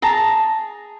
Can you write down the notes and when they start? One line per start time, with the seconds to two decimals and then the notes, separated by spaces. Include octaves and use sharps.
0.02 G#4 A5 A#5